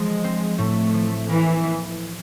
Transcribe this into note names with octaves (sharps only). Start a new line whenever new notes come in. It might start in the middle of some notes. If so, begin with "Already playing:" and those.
Already playing: F3 G#3
C4
A2 A3
F3
E3 A#3